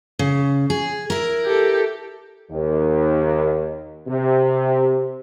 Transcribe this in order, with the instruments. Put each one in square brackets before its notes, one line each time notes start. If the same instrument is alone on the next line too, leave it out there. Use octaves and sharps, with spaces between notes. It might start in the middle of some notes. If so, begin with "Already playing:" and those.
[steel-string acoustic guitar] C#3
G#4
E4 A#4
[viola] G4 A4
[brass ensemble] D#2
C3